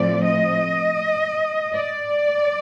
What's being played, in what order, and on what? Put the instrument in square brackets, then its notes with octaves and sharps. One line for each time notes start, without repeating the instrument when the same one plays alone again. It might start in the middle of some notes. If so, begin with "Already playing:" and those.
Already playing: [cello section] A2 F3 A3 C4 D5
D#5
D5